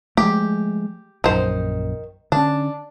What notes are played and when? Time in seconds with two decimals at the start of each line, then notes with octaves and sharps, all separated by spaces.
0.17 F3 G#3 A3 G4
1.24 A#1 F#2 D#3 C5
2.32 D3 C#4 D4